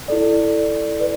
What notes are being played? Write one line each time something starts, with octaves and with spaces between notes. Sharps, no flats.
E4 A4 D5
B4 D5